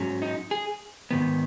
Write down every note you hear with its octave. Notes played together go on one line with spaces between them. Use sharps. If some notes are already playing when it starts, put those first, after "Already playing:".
Already playing: G#2 F#3 C#4
D#4
G#4
G#2 D#3 B3